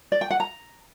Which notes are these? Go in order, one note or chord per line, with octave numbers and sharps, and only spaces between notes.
D5
G5
F#5
A#5